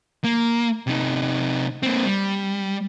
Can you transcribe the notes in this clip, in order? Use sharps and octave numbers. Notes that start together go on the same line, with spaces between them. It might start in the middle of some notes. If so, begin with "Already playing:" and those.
A#3
C3 D#4
A#3 C4
G3